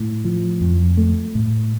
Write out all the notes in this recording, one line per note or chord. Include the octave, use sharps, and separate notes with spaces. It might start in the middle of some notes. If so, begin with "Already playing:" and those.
Already playing: A2
F3
F2
A3
A2